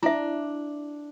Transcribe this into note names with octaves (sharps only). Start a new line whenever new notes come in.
D4 E4 E5